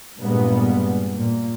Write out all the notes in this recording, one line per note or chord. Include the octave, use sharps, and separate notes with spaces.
G2 A#2 G#3 B3
A#2